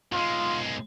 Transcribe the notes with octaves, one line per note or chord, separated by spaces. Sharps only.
B1 G#3 F4